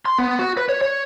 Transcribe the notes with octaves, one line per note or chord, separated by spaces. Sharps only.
C6
B3
F#4
B4
C#5
C#5